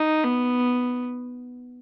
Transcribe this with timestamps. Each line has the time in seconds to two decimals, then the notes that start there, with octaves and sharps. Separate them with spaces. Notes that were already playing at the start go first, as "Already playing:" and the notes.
Already playing: D#4
0.24 B3